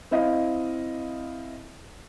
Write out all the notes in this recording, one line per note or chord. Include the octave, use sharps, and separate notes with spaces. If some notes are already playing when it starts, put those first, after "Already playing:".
C4 E4 D#5 F5